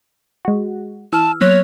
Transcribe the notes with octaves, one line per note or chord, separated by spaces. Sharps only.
G#3 F#4
E3 A5 E6 F6
F#3 A#3 B3 C#5